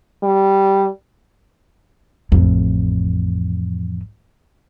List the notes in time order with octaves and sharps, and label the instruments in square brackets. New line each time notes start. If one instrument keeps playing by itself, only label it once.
[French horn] G3
[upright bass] A1 F2